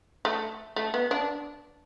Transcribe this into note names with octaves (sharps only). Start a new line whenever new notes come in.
A3
A3
B3
D4